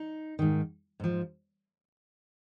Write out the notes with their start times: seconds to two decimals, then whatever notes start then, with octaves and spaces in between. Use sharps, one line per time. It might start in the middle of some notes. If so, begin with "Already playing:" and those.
Already playing: D#4
0.39 G#2 D#3
1.00 G#2 F3